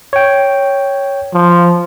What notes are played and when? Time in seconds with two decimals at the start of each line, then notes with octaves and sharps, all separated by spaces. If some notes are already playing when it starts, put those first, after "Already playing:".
0.13 C#5 G5
1.34 F3